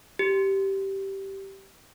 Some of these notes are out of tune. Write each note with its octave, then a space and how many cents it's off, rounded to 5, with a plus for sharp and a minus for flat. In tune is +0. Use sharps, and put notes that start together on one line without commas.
G4 -10